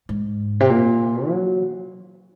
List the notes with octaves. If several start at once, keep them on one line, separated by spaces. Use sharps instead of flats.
G#2
C3
A#2
F#3